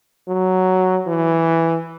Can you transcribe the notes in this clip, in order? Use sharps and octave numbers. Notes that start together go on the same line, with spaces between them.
F#3
E3